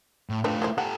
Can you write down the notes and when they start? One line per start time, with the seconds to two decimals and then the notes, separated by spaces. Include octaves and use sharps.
0.30 A2
0.44 A3 C4 D4 F4 B4
0.62 E4 A#4 C5
0.78 G4 A4 F#5